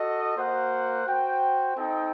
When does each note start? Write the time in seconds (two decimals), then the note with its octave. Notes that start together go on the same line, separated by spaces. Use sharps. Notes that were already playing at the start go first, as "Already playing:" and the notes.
Already playing: F#4 A4 D#5
0.36 A#3 F#4 C5 F#5
1.05 F#4 C5 G5
1.75 C4 D#4 A4 D#5 G5